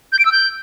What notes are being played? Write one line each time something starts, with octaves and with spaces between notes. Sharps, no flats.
G6
D7
E6
G6